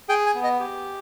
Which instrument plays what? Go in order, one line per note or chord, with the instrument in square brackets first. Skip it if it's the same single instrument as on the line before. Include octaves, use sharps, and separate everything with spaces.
[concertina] G#4 G5
G#5
B3
D#5
G4